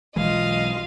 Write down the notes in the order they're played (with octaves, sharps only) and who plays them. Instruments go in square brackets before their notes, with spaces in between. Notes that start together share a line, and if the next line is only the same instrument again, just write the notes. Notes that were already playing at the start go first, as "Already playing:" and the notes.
[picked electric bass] B1 E3 G#3 [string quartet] F4 D#5 F5